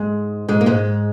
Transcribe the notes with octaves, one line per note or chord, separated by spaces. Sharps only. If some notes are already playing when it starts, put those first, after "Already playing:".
Already playing: G#2 G#3
G#2 G#3
A#3
G#2 G#3